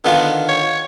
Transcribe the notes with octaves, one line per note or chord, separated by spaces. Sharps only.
D3 D#3 B3 F4
C#5